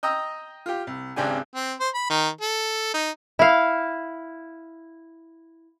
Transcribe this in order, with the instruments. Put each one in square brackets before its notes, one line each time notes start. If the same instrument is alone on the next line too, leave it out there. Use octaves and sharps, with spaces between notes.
[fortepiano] D#5 G5 A#5 D#6 E6
F4 G4
C2
G#1 C#2 C4 D4 G4 G#5
[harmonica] C4
C5
B5
D#3
A4
D#4
[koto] E4 F5